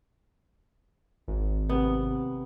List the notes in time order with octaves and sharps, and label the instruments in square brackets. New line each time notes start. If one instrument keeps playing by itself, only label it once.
[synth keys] G#1
[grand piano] C3 [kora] B3